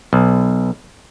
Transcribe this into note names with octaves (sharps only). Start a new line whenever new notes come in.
B1